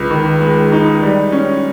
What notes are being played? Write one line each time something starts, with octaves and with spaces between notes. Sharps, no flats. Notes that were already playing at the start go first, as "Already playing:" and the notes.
Already playing: C#2
D#3
G#3
D#4
G3
C#4